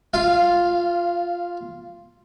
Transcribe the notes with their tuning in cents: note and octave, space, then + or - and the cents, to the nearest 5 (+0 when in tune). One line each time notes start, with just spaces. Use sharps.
F4 +0 F5 -20